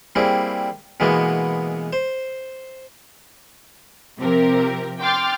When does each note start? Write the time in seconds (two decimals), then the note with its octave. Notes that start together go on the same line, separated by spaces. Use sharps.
0.15 G3 A#3 C4 E4 G#4
1.00 B2 E3 G#3 A#3 B3
1.93 C5
4.19 C3 F3 C4 G4 A#4
5.00 G5 C6 D6 F6 G6 A6